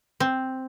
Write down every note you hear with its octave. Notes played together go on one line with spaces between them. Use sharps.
C4